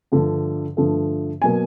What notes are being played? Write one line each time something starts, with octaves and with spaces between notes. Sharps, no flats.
G2 D3 F3 A3
G2 D3 F3 A3
B2 F#3 A#3 G#5